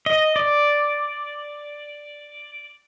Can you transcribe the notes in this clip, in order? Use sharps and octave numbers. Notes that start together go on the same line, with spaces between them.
D#5
D5